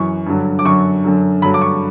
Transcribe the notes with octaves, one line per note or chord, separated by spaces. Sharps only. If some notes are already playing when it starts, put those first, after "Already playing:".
Already playing: F#2 E3 C#6
G2 D3 F#3
D6
F#2 D3 F#3 C#6
F#2 D3 F#3
G2 D3 F#3 B5
D6
C#6